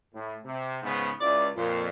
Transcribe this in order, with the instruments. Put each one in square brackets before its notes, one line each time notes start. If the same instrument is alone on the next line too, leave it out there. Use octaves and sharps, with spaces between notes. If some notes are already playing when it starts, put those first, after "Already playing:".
[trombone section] A2
C3
G#2 C#3 B3
[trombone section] C#2 [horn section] E4 D5
[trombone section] F2 [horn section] A#2